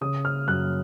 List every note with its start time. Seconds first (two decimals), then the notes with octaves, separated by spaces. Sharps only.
0.01 C#3 D#6
0.25 F6
0.48 F#2 F#6